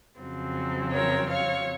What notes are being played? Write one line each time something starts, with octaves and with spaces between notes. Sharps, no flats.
F2 C#3 F#3 C4
A#4 C#5
C#5 F5